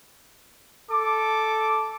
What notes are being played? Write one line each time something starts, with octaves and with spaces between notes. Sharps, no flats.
A4 D6